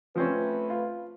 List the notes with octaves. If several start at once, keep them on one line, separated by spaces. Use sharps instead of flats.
F3 A3 C4 C#4 B4
F4